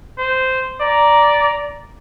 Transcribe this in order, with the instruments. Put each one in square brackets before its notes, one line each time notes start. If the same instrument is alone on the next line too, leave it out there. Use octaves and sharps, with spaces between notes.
[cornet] C5
[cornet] D5 [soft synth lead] A#5